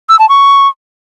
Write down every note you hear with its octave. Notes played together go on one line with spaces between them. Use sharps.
E6
A5
C#6